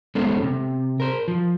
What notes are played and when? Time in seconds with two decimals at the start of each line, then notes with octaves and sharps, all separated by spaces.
0.15 G#3 B3 C#4 A4 C5
0.43 C3
1.00 A#4 C5
1.28 F3